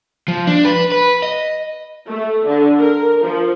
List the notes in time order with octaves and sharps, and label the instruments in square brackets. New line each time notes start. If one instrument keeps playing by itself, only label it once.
[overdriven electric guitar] F3
D4
B4
B4
D#5
[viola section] A3
D3
A#4
F3